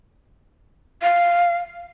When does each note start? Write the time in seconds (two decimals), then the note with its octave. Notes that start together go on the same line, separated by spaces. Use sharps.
1.02 F5